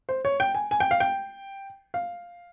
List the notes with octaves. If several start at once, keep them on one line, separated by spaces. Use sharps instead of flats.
C5
C#5
G5
G#5
G#5
G5
F5
G5
F5